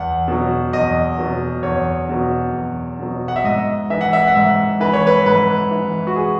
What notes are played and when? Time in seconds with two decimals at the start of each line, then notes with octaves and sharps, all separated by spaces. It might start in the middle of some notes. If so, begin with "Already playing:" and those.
Already playing: E2 F#5
0.28 B2 F#3
0.73 E2 D#5
1.18 B2 F#3
1.63 E2 C#5
2.09 B2 F#3
2.54 E2
2.99 B2 F#3
3.28 F#5
3.36 E5
3.45 G#2 D#5
3.90 E3 E5
4.01 F#5
4.13 E5
4.27 F#5
4.35 G#2 E5
4.80 E3 B4
4.93 C#5
5.07 B4
5.26 G#2 B4
5.71 E3
6.07 F#4
6.16 G#4